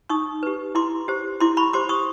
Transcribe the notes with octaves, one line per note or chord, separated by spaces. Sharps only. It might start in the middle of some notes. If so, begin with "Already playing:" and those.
D#4 C#6 D#6
G4 B4
E4 C6 D6
G4 C5
E4 C6 D6
B5 C#6
G4 C5 C6 D6
C#6 D#6